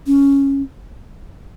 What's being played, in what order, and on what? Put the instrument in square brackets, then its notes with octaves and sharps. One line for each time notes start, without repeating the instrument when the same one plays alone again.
[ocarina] C#4